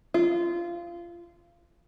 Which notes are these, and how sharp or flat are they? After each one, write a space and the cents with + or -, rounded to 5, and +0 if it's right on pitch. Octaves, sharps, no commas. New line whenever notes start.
F4 -25